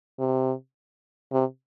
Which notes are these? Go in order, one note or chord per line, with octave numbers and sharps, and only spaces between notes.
C3
C3